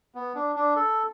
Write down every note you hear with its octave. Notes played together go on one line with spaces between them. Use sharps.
B3
D4
D4
A4